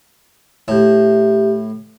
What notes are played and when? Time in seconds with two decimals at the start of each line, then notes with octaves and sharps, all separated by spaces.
0.68 A2 G4 E5